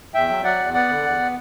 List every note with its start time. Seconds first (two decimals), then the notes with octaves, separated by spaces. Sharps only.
0.14 E2 E5 G5
0.29 F#3
0.44 F#3 D5 F#5
0.59 E2
0.74 B3 D5 F#5
0.89 D3
1.04 E2
1.19 B3